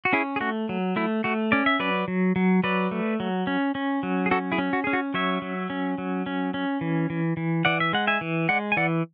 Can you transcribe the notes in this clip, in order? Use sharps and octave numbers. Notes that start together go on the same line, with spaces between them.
F#4
C#4 E4 G#4
G#4
A3 F#4
F#3
A3 E4
A3 F#4
C#4 D5
E5
F#3 B4 D5
F#3
F#3
F#3 B4 D5
A3
F#3
C#4
C#4
F#3
G#4
C#4 F#4 A4
E4 G#4
C#4
F#4
C#4 G#4
F#4
F#3 C#5 E5
F#3
C#4
F#3
C#4
C#4
E3
E3
E3
E3 D5 F#5
E5
G#3 F#5
E5 G#5
E3
G#3 D5 F#5
G#5
E3 D5 F#5